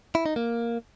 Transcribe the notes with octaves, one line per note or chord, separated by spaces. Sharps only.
E4
D#4
A#3